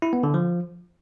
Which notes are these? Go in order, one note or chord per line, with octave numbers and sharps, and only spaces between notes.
E4
B3
D3
F3